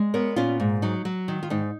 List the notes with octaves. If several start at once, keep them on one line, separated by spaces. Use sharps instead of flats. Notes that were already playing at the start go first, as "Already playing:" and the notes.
Already playing: G#3
B3 A#4 C#5
A#2 C#4 F4
G#2
F#3 D#4
F#3
D#3
F4
G#2 D#4